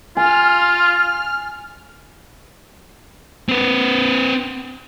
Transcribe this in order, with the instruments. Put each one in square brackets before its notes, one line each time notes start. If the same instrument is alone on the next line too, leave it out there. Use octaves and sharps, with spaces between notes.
[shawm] F4 [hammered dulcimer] G#5 [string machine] F6
[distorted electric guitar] C4 B4